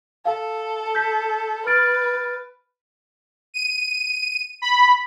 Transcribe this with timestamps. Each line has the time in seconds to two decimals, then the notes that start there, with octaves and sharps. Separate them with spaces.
0.25 A4 F5
0.95 G6 B6
1.67 B4 F6 A6 D7
3.54 D#7
4.62 B5